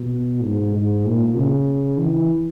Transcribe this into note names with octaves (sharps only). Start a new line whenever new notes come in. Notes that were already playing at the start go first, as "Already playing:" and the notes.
Already playing: B2
G#2
G#2
A#2
C#3
E3